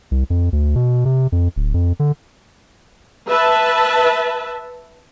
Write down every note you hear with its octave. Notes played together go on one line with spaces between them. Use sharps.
C2
F2
D2
B2
C3
F2
D1
F2
D3
B4 E5 A5